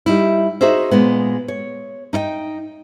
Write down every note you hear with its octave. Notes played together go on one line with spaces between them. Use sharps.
G3 D#4 E4
D#4 F#4 G#4 C5 D#5 E5
A#2 G#3 B3
C#5
D#4 E4 D#5 G5